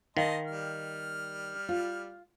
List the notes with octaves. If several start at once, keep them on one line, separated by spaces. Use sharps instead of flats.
D#3 D#5 F5 A5 C6
G3 F6
F4